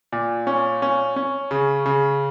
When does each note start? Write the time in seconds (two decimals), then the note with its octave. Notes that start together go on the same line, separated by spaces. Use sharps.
0.12 A#2
0.47 C#4
0.82 C#4
1.16 C#4
1.51 C#3
1.86 C#3